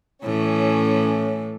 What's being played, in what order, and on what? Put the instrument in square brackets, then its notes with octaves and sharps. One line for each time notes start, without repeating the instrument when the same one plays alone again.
[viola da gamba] A2 E3 [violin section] C#4